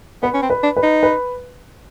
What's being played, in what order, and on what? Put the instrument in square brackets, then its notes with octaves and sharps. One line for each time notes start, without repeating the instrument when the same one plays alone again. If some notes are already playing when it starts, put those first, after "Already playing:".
[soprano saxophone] B3 [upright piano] B4
[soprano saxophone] C#4
C4
[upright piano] B4
[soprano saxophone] D4
[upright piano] B4
[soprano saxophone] D#4
[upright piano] B4